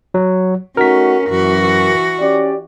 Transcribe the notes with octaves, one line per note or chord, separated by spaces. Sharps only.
F#3
A3 C#4 D#4 F#4 A#4 B6
F#2 E3 F#4
C#4 G4 D5